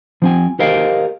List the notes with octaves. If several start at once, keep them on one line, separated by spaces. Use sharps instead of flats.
F3 C4 G#5
G4 A4 A#4 C5 D#5 F5